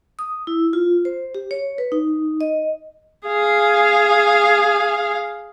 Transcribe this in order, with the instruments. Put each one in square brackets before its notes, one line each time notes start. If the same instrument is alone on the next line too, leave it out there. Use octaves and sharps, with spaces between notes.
[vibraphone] D#6
E4
F4
C5
G4
C#5
B4
D#4
D#5
[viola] G#4 F5